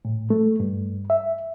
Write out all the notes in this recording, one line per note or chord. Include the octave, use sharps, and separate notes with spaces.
A2
A3
G2
E5